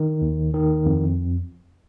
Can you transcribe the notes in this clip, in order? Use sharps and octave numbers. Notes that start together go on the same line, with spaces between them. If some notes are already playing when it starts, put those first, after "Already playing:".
Already playing: D#3
D#2
D#3
F2